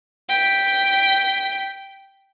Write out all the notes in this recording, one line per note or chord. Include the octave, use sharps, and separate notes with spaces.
G5 B6